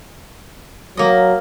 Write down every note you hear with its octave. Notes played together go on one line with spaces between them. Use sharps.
F#3 A#3 D#5